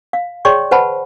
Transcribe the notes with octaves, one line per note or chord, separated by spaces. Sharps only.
F5
G#4 C#5 D5 G5 C6 C#6
B4 C5 F#5 A5 B5